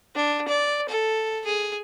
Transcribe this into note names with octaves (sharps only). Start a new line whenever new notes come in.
D4
D5
A4
G#4